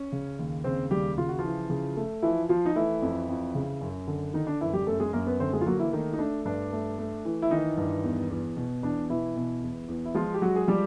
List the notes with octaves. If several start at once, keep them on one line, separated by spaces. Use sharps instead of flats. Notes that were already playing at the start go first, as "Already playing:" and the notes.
Already playing: C#4
C#3
D#2
C#3 C4 C5
D#2 G3 G4
C#3 F4
F#4
F3 F4
E3
C#3
A3
E3 F3 E4
F3 F4
D#4
E3 A3 E4
F2
F2
C#3
F#2
D3
D3 D#3 D#4
D4
F#2 E3 E4
G3 G4
F#2 A3 A4
G#3 G#4
F#2 A#3 A#4
B3 B4
D3 C4 C5
G#3 G#4
F4
F#3 A#3 F#4
E3 E4
D#3 A3 D#4
D#4
A3 D4
G2 D4
A3
A3
E3
E4
D#3 E3 D#4
G2
E2
E2
B2
E2 D4
B2 E3 E4
B2
E2
E2
E4
F3 G#3 F4
G4
F#3 G#3 F#4
G#4
F3 G3 G4